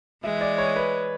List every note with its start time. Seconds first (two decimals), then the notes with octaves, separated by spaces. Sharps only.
0.24 E3 G#3 E5
0.41 D5
0.58 C#5
0.76 B4